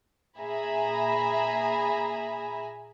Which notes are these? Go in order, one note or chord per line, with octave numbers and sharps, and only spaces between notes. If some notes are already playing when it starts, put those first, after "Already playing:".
A#2 G#4 E5 G#5 A#5 B5